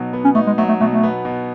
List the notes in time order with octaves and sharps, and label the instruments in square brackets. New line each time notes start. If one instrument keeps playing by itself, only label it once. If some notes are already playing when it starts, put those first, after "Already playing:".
Already playing: [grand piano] B2 F#3 B3 D#4
B3
[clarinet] C#4
[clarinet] A3 [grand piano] D#4
[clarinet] G#3
[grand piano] F#3 [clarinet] A3
[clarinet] A3
[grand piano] B2 [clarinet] A3
[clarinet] A3
[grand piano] B3
B2